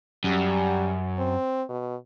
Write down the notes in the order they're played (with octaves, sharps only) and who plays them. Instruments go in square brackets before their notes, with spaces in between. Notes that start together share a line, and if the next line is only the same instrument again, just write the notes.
[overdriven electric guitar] F#2 [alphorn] G3
[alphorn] C4
B2